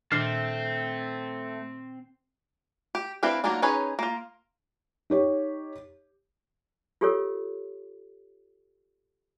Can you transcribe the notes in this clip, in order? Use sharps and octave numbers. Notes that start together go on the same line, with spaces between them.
A#2 D#3 A3 C4 D4 A4 F6 C7
G4
C4 D4 E4 B4 F5
F#3 A#3 D4 D#4 F4
C#4 D#4 G#4 B4 C#5
A#3 F4
D#4 G4 C#5
F4 G4 A4 A#4 C#5